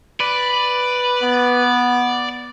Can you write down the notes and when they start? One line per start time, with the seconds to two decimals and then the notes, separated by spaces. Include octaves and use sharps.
0.20 B4 D5
1.22 B3